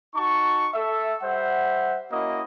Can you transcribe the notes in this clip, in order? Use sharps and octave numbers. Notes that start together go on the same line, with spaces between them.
D#4 F#4 A5 C#6
A4 E5
G3 C5 E5 F#5
A#3 C#4 E4 F#4 D#5 D#6